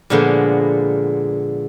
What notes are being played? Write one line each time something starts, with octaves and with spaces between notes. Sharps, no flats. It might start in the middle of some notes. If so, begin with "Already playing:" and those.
A#2 D3 F3 G#3 A#3 B3